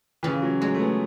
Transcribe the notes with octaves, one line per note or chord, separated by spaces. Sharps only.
C#3 E3
F#3
F#3 G#3
A3
B3